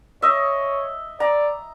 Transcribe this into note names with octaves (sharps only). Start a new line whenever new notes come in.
C#5 D#5 E5
D5 A#5